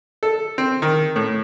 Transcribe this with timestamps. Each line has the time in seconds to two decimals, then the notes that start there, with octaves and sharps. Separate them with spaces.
0.23 A4
0.58 C4
0.82 D#3
1.16 A2